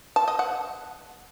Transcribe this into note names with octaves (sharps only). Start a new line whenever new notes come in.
A5
D#5
F#5